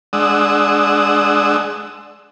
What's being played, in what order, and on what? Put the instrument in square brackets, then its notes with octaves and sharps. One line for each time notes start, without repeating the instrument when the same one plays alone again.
[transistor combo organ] G#3 D4 F#5 D#6 E6